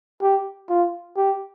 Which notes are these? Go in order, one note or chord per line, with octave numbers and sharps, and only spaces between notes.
G4
F4
G4